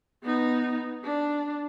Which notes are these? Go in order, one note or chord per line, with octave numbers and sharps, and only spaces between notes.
B3 D#4
D4